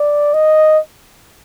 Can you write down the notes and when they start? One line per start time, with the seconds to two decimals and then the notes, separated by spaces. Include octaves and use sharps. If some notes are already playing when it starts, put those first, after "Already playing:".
Already playing: D5
0.34 D#5